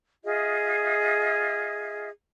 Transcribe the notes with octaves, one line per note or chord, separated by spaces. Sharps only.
F4 G#4 D#5 E5